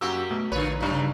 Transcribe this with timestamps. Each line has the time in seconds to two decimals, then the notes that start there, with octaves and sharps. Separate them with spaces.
0.01 F#2 A#3 F#4 G4 E6
0.31 B2 A3
0.52 A#1 D3 F4 B4 C#5
0.80 B1 G2 F#3 D#4
0.92 C#3